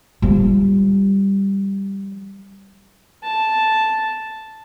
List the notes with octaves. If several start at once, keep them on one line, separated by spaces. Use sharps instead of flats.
F3 G3
A5